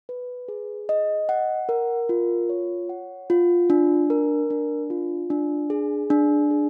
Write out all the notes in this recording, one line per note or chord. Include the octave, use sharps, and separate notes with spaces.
B4
G#4
D#5
F#5
A#4
F4
C#5
F#5
F4
D4
A#4
D4
F4
D4
G#4
D4
G#4